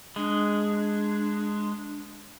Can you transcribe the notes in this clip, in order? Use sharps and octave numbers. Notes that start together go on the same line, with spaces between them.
G#3 D4